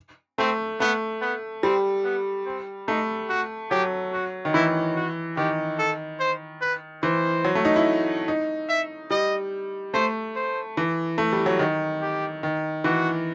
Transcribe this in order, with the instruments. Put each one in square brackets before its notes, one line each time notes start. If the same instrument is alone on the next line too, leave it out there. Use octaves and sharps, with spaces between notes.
[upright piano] A3 [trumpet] C4
[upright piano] A3 [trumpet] B3
[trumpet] B3
[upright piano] G3 [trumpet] C4
[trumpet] B3
C4
[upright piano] A3 [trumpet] D#4
[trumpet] F#4
[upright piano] F#3 [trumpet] G4
[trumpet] F#4
[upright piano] D#3
[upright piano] E3 [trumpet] E4
[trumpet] F#4
[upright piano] D#3 [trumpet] G4
[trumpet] A4
C5
B4
[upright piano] E3 [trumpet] C5
[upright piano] F#3
A3
D#4
E4
D#4
[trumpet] E5
[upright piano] G3 [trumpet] D#5
[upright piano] A3 [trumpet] C5
[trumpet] C5
[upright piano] E3
A3
G3
F#3
D#3
[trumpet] G4
[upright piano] D#3
[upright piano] E3 [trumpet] F#4